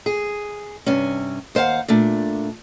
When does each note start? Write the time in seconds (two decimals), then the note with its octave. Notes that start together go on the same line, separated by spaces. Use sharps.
0.06 G#4
0.86 G2 C3 C#4
1.55 D#2 C5 C#5 F5 F#5
1.88 A#2 A3 D4